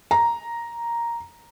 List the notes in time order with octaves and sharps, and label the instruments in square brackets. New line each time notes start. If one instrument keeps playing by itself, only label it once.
[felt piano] A#5